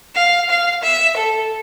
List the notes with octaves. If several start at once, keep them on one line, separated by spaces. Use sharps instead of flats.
F5
F5
E5
A4